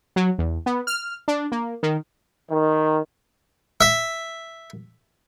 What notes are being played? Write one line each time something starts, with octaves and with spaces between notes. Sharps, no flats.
F#3
E2
B3
F6
D4
A#3
D#3
D#3
E5